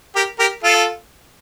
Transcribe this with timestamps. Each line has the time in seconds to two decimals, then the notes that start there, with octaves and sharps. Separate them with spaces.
0.16 G4 A#4
0.39 G4 A#4
0.63 F4 A4